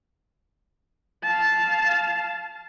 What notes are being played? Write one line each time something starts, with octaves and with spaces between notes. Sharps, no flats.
F5 A5